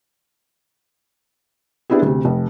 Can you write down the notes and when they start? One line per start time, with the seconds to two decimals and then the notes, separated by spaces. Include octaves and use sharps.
1.90 B3 D4 E4 G4 G#4
2.02 D2 C3
2.25 F1